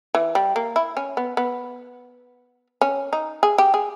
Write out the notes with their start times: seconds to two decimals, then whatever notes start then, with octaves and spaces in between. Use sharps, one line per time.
0.15 E3
0.35 G3
0.56 A#3
0.76 E4
0.97 C#4
1.17 B3
1.37 B3
2.81 C#4
3.13 D#4
3.43 G#4
3.58 G4
3.74 G#4